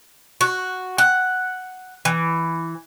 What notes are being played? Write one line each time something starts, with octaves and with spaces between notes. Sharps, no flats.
F#4
F#5
E3